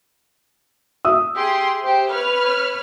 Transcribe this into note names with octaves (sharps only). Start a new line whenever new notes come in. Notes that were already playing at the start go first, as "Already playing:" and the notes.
E5 D#6 E6
G4 G#4 C6
G4 C5
B4 C#5 F6